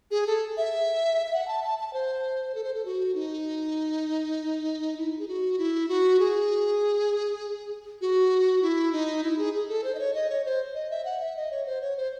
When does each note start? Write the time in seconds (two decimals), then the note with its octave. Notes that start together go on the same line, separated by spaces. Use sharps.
0.11 G#4
0.27 A4
0.57 E5
1.26 E5
1.33 F#5
1.48 A5
1.64 A5
1.79 A5
1.93 C5
2.55 A4
2.64 C5
2.74 A4
2.85 F#4
3.15 D#4
4.97 E4
5.19 G#4
5.28 F#4
5.58 E4
5.89 F#4
6.19 G#4
8.01 F#4
8.62 E4
8.92 D#4
9.24 E4
9.38 G#4
9.54 G#4
9.69 A4
9.84 C5
9.95 D#5
9.99 C#5
10.14 D#5
10.30 C#5
10.45 C5
10.75 D#5
10.90 E5
11.05 F#5
11.20 E5
11.37 D#5
11.51 C#5
11.66 C5
11.82 C#5
11.97 C5